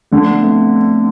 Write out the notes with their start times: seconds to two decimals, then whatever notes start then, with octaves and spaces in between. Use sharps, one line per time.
0.12 D3 F3 A3
0.31 B3
0.43 A3 C4